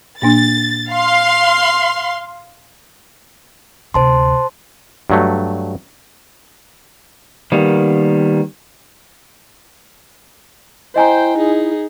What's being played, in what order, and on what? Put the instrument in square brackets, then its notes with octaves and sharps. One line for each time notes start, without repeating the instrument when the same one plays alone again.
[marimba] A#2 A#3 D4 [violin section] A6
[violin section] F5 C6
[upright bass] D2 C3 [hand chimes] C5 A5 C6
[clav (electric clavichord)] G2 F#3 A3
[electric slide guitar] D#3 G3 A#3 B3
[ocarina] E4 [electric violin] C5 G5 [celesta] D#5 G#5 A#5
[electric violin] D#4 G#4